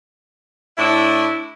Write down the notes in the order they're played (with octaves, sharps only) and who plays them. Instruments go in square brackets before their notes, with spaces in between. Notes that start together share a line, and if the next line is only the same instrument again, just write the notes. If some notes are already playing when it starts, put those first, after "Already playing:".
[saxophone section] A2 D4 E4